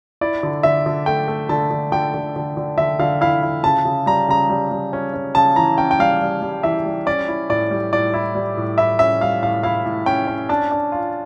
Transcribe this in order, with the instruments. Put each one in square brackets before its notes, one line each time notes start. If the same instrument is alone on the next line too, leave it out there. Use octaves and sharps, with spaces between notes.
[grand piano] E4 D5
D3
D3 E5
D3
A3 G5
A3
D3 A5
D3
D3 G5
D3
D3
D3
D3 E5
D3 F5
E4 F5
E4
C#3 A5
C#3
G3 A#5
C#3 A#5
G3
G3
C#4
C#4
C#3 A5
E3 A#5
C#4 G5
G5
G3 F5
G3
G3
E3 E5
G3
C#4 D5
E4
A2 D5
G3
A2 D5
E4
G3
A2
E4 E5
C#4 E5
G3 F5
A2 F5
E4 F5
A2
C#4 G5
C#4
D4 A5
D4
F4